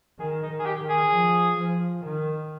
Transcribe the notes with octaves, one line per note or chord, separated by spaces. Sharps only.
D#3 G#4
D#4
D#3
G#4
G4
D#3
G#4
F3
F3
D#3